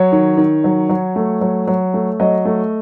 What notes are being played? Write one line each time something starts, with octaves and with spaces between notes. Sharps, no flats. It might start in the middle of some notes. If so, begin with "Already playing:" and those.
Already playing: F#3 C#5
D#3
D#3
F#3
F#3
A3
F#3
F#3
A3
F#3 D#5
A3